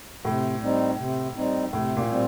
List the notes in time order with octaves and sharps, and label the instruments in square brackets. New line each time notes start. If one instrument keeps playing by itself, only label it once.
[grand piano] A2 [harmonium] C3
[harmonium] G3 C4 D#4
C3
G3 C4 D#4
[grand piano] A2 [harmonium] C3
[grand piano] A#2
[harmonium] G3 C4